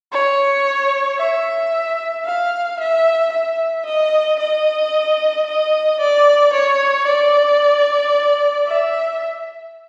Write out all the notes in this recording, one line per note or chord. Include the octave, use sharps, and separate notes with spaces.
C#5
E5
F5
E5
E5
D#5
D#5
D#5
D5
C#5
D5
E5